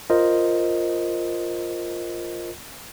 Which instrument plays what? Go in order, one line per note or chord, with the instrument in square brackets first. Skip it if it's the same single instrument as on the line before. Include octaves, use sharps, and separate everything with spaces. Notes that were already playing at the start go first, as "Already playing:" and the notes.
[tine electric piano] F4 A#4 C5 D#5